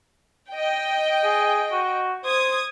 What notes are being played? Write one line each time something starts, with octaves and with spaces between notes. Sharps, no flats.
D#5 G5
G#4
F#4
C5 D#6 G#6